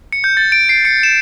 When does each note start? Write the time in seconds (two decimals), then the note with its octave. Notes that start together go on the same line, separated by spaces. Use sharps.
0.13 C#7
0.24 G6
0.37 A6
0.52 D7
0.69 C7
0.85 C#7
1.03 E7